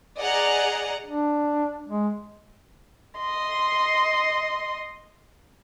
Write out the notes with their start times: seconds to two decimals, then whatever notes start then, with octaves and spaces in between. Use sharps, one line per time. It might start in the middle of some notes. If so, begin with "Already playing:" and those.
0.20 G#4 D5 D#5 F#5 A#5
1.06 D4
1.88 G#3
3.19 D#5 C6